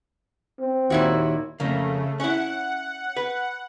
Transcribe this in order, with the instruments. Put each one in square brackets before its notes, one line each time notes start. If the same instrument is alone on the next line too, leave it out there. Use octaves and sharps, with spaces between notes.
[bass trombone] C4
[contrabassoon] D#2 [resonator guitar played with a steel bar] A#2 E4 F#4
[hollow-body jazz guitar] F2 A#3 [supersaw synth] C#3 A3
[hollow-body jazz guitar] C#4 E4 [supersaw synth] F#5
[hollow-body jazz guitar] B4